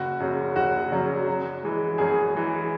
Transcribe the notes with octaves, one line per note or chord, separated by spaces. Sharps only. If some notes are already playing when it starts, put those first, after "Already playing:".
Already playing: F#1 F#4
F#2 C#3 F#3
F#1 F#4
F#2 C#3 F#3
F#2
E3 G#3
F#2 G#4
E3 G#3